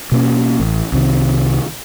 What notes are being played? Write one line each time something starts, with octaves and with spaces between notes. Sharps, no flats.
B2 A#3 C#4
A1
C2 C3 D#3